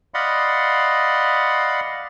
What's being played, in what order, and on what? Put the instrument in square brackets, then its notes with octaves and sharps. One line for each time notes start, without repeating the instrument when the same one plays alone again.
[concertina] D5 D#5 F5 F#5 B5 C6